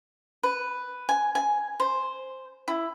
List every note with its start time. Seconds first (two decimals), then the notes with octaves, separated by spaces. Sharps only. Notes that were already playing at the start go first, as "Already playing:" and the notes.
0.43 B4
1.09 G#5
1.35 G#5
1.80 C5
2.68 E4